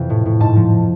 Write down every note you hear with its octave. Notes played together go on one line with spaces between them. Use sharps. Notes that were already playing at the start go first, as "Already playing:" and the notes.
Already playing: F2 C3 E3
A2
A2
G#2 A5
F3